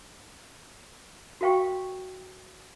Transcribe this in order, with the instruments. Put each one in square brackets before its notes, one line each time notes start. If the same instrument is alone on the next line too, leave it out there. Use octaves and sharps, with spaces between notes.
[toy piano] F#4 A#4 F5 G5 C#6